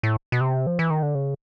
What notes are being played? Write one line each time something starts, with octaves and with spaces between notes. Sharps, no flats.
A2
B2
C3
F3
E3
D#3
D3
C#3